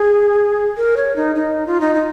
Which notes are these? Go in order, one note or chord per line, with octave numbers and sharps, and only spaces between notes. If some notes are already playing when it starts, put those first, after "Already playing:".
Already playing: G#4
A#4
C#5
D#4
D#4
F4
D#4
D#4